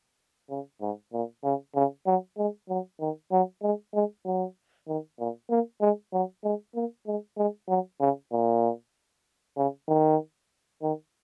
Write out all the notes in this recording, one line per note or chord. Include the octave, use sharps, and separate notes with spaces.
C#3
G#2
A#2
C#3
C#3
F#3
G#3
F#3
D#3
F#3
G#3
G#3
F#3
D#3
A#2
A#3
G#3
F#3
G#3
A#3
G#3
G#3
F#3
C#3
A#2
C#3
D#3
D#3